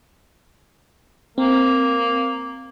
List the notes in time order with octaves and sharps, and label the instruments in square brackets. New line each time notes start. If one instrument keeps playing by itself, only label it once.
[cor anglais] A#3 [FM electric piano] C4